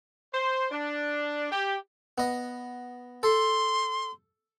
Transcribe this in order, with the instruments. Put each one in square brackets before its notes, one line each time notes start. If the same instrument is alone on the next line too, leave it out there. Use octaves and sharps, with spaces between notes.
[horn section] C5
D4
G4
[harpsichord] B3 D#5
[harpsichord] A4 [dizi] C6